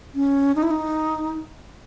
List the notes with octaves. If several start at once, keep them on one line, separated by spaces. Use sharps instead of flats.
C#4
D#4
E4
D#4